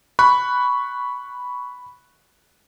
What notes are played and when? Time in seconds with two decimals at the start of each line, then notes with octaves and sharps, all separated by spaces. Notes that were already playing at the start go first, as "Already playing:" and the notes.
0.19 B5 C#6 F#6